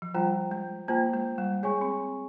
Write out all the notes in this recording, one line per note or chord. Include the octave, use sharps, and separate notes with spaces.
F3
G3 F4 C5 G5 A#5
G#3
A#3 F4 C5 G5 A#5
G#3
G3
G#3 G#4 C#5 G#5 C#6
C4